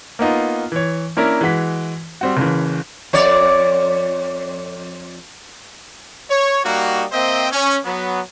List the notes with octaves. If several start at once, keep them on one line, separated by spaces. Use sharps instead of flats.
A#3 B3 D#4 F4
E3 C#5
A#3 C#4 D4 E4 A#4
E3 G#3 F#4 B6
G3 C4 F#4
F#1 C#3 E3
F2 C#5 D5
C#5
G3 A#3 D#4 F#4
A#3 C4 C5 D#5 E5 G5
C#4
F#3 B3